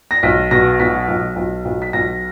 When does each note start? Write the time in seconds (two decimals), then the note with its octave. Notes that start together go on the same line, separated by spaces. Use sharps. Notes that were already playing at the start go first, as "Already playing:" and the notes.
0.11 A#6
0.23 B1 B6
0.51 B2 A#6
0.80 B1 B6
1.08 B1
1.36 B1
1.65 B1
1.82 B6
1.93 B1 A#6